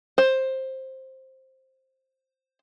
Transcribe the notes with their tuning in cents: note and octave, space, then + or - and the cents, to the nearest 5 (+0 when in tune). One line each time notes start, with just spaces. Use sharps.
C5 +10